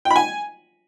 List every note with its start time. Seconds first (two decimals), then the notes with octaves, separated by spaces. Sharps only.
0.05 G5
0.10 B5
0.16 G#5